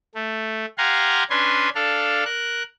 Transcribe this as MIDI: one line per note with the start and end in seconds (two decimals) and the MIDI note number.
0.15 0.65 57
0.78 1.23 67
0.78 1.23 77
0.78 1.23 78
0.78 1.23 80
0.78 1.23 82
0.78 1.23 84
1.30 1.69 61
1.30 1.69 62
1.30 1.69 71
1.30 1.69 80
1.30 1.69 84
1.75 2.24 62
1.75 2.24 69
1.75 2.24 77
2.25 2.63 70
2.25 2.63 90